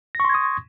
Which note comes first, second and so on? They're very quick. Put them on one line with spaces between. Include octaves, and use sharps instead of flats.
A#6 C#6 C6 G#6 D#6